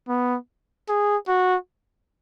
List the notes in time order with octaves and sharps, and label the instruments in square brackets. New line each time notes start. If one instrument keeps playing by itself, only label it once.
[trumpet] B3
G#4
F#4